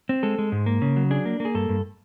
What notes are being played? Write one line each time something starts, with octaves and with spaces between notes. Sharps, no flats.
C4
G#3 A4
G#3
G#2
A#3
C#3
F#3
D4 G#4
A#3
A#3
G#4
G2 A4
G2